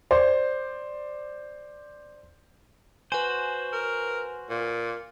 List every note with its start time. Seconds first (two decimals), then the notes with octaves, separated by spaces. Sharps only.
0.11 C5 D5
3.12 F#4 B4 C5 G#5
3.73 A#4
4.50 A#2